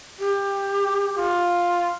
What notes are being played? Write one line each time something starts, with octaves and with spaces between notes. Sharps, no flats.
G4
F4